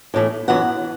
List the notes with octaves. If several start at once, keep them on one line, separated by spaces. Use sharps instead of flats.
A2 E3 A3
F#2 E3 B3 F#5